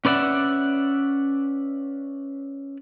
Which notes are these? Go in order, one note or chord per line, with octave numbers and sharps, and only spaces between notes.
C#4 B4 D5 E5 F#5